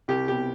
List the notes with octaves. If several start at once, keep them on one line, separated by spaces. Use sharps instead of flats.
C2 G4
B2 G4